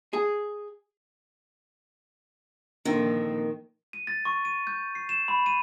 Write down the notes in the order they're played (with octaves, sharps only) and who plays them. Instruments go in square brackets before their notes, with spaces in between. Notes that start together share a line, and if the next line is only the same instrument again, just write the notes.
[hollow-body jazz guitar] G#4
[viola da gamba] A#2 F3 [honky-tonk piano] D3 [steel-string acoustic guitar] D#3 [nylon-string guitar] C4 F4
[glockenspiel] D#7
A6
C#6
D#7
G6
C7
E7
B5
D#7